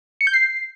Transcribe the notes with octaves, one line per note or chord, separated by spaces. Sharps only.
C#7
G6
C7